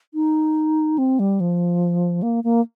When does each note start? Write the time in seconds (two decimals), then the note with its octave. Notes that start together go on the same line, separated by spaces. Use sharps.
0.14 D#4
0.98 C4
1.19 G3
1.40 F3
2.23 A#3
2.44 A#3